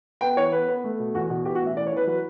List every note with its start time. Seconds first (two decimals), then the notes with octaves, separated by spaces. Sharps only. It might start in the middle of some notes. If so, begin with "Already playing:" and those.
0.21 B3 G5
0.36 E3 C#5
0.52 B3 B4
0.68 B3
0.84 A3
0.99 B2
1.14 E2 F#4
1.30 B2 F#4
1.45 E3 G4
1.55 F#4
1.61 A1
1.66 E5
1.76 E3 D5
1.87 C#5
1.92 E3 B4
2.07 F#3 B4